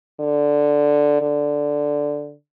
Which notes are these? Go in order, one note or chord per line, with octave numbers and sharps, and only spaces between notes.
D3
D3